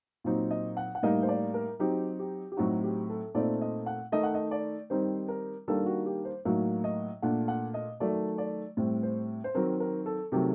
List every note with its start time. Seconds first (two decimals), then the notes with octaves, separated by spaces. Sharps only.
0.24 A#2 F#3 C4 D#4
0.51 D#5
0.77 F#5
0.95 F#5
1.03 A2 G3 A#3 D#4 D#5
1.23 C5
1.28 D5
1.54 A#4
1.79 F#3 C4 D#4 G4
2.19 G4
2.52 G4
2.57 A2 F#3 C4 D#4 F#4
2.84 G4
3.09 A4
3.35 A#2 A3 C4 D#4 D5
3.61 D#5
3.86 F#5
4.12 D#3 A3 D#4 D#5
4.23 F#5
4.35 D#5
4.51 D5
4.90 D#3 G3 C4 D#4 C5
5.28 A#4
5.68 D#3 G3 A#3 D4 A4
5.86 F#4
6.06 G4
6.25 C5
6.45 A2 F#3 A#3 D#4
6.84 D#5
7.22 A#2 A3 D4 F#5
7.48 F#5
7.74 D#5
8.00 D#3 F#3 A3 D5
8.38 D5
8.77 A2 G3 C4
9.03 C5
9.44 C5
9.54 D#3 F#3 C4 A#4
9.80 A#4
10.06 A4
10.32 C3 D#3 F#3 A3 G4